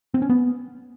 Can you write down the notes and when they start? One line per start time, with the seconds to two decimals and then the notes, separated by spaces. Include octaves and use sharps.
0.14 C4
0.22 C#4
0.30 B3